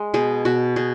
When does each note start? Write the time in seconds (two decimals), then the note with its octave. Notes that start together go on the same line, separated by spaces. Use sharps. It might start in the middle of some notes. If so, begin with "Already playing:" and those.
Already playing: G#3
0.14 B2 G#4
0.45 B2 F#4
0.76 B2 G#4